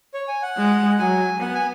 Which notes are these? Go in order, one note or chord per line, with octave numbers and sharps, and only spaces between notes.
C#5
G#5
F#5
G#3
F#3 G#5
B3 F#5
G#5